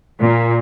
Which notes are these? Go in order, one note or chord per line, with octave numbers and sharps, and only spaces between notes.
A#2